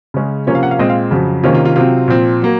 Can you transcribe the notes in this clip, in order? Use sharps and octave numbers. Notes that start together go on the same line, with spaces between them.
C#3 G#3 C#4
C3 F3 A#3 C#4 C#5
F5
F#5
F5
A#2 G#3 C4 D#5
F5
F2 C#3 F#3
C3 D#3 A#3 C#4 F4
F4
F4
C3 F#3 C4 F4
A#2 F3 C4
F#3 A#3